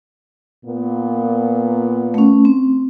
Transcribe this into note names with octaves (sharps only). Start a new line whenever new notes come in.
A#2 A#3 B3
A3 C#4
C4